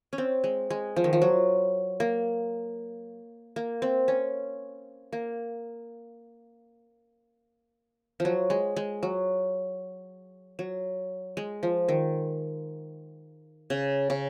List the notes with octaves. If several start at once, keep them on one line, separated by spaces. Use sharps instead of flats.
C#4
C4
G#3
G#3
F3
D#3
F3
F#3
A#3
A#3
C4
C#4
A#3
F3
F#3
G#3
G#3
F#3
F#3
G#3
F3
D#3
C#3
C#3